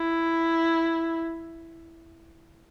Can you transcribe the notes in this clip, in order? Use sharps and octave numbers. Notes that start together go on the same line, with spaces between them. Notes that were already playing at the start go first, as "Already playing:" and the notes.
Already playing: E4